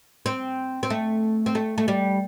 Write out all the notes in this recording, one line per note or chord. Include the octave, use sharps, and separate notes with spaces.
C4
C4
A3
C4
A3
A3
G3